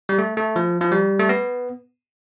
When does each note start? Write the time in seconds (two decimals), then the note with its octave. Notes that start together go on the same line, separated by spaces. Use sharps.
0.09 G3
0.18 A3
0.37 A3
0.56 F3
0.81 F3
0.92 G3
1.19 A3
1.29 B3